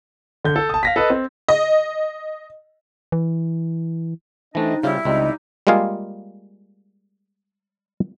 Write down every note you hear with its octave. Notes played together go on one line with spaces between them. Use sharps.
D3 G6
A4
A5 D#6
F5 A#6 B6
A4 B4 D#5
C4
D#5
E3
E3 A3 C4 D4 D#4 D#5
C#3 G3 E4 F4 C5
C#2 G3 C4 D#4 D#5
G3 G#3 A#3 F4 G#4 F5